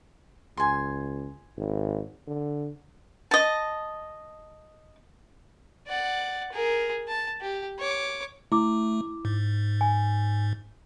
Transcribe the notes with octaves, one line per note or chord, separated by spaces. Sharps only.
C#2 G#5 C6
G#1
D3
D#5 A5
D5 F#5
G#4 A#4
A5
G4
C#5 D6
A3 E4 D6
G#2
G#5